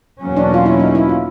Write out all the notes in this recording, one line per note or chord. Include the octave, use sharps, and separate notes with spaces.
E2 B2 F#3 A#3 C#4
D4
F4
E4
D#4
E4
F4